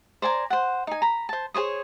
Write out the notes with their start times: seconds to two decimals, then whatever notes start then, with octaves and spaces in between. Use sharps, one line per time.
0.22 C5 D5 G#5 A#5
0.50 C5 F#5
0.87 D#4 G#5
1.02 A#5 B5
1.29 C5 A5
1.54 G#4 C5 C#5 D#6